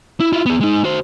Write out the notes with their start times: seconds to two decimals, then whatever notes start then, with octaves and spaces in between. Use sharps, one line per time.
0.20 E4
0.32 E4 F4
0.46 B3 G#4
0.60 G#3 D#4
0.84 F#4 C5